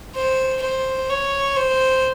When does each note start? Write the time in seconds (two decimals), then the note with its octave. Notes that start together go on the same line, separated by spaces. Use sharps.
0.15 C5
0.62 C5
1.10 C#5
1.56 C5